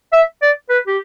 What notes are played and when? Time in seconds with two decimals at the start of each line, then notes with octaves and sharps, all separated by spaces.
0.13 E5
0.42 D5
0.69 B4
0.87 G4